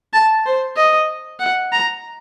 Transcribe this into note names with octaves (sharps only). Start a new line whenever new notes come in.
A5
C5
D#5
F#5
A#5